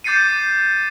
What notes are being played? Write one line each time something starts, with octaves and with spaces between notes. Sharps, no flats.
D6 G6 A6 C7 C#7 D#7